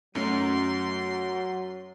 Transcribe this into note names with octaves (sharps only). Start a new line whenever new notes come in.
F#2 F#3 A3 C#4 D#4 C6